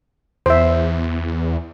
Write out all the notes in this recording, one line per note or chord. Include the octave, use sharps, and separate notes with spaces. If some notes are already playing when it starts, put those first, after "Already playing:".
E2 C5 E5